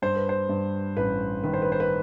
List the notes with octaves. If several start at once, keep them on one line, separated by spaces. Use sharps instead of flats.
G2 C5
B4
C5
G2
A1 B4
D#3 B4
C5
B4
C5
B4